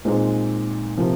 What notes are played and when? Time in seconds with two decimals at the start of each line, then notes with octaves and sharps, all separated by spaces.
0.05 A#2 G#3 C4 D#4
0.97 C3 F3 A#3